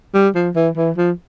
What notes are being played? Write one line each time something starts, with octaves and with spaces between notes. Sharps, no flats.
G3
F3
E3
E3
F3